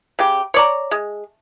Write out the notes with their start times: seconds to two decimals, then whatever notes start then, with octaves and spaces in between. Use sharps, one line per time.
0.19 C#3 G4
0.54 C#5 D5 A#5
0.91 G#3